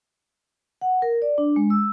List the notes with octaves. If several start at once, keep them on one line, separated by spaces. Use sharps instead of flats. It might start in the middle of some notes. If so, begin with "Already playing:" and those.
F#5
A#4
D5
D4
G#3
E6